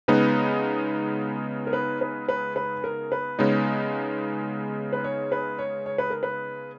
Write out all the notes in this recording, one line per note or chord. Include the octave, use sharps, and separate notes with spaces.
C#3 G#3 B3 D#4 B4
A#4
B4
B4
B4
B4
A#4
B4
C#3 G#3 B3 D#4 C#5
B4
C#5
B4
C#5
C#5
B4
A#4
B4